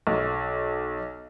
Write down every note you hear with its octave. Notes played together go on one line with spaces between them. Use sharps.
B1